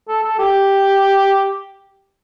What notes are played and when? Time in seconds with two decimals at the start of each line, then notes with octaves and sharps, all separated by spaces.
0.09 A4
0.24 A4
0.39 G4